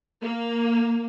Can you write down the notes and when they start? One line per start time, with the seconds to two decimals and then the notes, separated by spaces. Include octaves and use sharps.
0.22 A#3